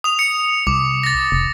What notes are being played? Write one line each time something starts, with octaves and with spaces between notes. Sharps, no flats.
D#6 F7
C#7
C2 D6
A6 A#6
F1